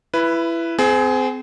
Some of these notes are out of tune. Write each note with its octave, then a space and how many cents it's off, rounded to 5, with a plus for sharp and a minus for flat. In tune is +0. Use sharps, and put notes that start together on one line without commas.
E4 +20 B4 +0
C4 -30 G#4 +20